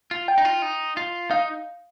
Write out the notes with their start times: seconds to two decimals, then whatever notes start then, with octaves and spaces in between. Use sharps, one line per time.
0.11 F4
0.28 G5
0.38 D#4
0.45 F4
0.62 D#4
0.97 F4
1.31 D#4 F5